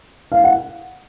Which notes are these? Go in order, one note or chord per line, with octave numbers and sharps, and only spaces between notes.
F5
F#5